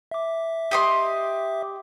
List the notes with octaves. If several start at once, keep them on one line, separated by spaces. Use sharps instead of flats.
E5 D6
G4 D#5 C6